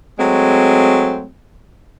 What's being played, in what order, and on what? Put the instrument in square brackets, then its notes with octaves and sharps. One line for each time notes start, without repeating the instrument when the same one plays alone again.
[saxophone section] F#3 G#3 A3 C4